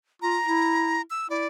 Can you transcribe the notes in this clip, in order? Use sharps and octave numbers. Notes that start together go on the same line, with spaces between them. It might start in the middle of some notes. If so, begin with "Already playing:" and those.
F4 A#5
E4
E6
E4 D5